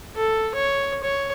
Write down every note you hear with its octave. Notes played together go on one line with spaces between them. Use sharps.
A4
C#5
C#5